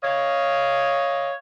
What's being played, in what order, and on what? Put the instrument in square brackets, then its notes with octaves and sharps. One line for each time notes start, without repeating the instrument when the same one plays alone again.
[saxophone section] C#5 D#5 F5